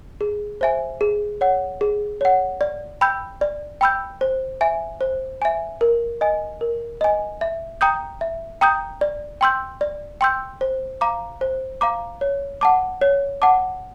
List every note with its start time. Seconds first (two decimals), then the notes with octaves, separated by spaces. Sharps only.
0.21 G#4
0.61 C5 E5 G#5
1.01 G#4
1.41 C#5 F#5
1.81 G#4
2.21 C#5 F#5
2.61 D5
3.01 G5 B5 E6 G6
3.41 D5
3.81 G5 B5 E6 G6
4.21 C5
4.61 E5 G#5
5.01 C5
5.42 E5 G#5
5.81 A#4
6.21 D#5 G#5
6.61 A#4
7.01 D#5 G#5
7.41 E5
7.81 G5 A#5 D#6 G6
8.21 E5
8.61 G5 A#5 D#6 G6
9.01 D5
9.41 G5 C6 E6 G6
9.81 D5
10.21 G5 C6 E6 G6
10.61 C5
11.01 F5 A#5 D6
11.41 C5
11.81 F5 A#5 D6
12.21 C#5
12.61 F#5 A5 D6
13.01 C#5
13.42 F#5 A5 D6